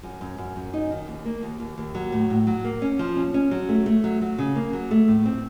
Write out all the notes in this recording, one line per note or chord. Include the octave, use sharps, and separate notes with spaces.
F#2
F#2
F#2
F#2
D#4
D#3
D#2
A#3
D#2
D#2
D#2
F#3
A2
A2
F#3
A#3
C#4
F3
C#4
C#4
F#3
A3
A3
F#3
F#3
C#3
A#3
F#3
A3
A2
C4